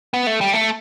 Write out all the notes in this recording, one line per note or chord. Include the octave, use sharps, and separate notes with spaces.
B3
A3
G3
A3